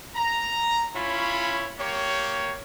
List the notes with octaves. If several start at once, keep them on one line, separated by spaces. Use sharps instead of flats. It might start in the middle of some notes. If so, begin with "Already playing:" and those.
A#5
C#4 E4 F4 C#5 B5
A#3 G4 C#5